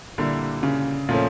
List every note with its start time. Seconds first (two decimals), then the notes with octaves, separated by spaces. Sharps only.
0.18 A#2 D3 G3 A#3 E4
0.63 C#3
1.09 A#2 F3 A3 C#4